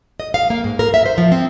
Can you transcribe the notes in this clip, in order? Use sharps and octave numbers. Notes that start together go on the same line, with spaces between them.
D#5
F5
A#3
G#2
A#4
E5
C5
F3
C4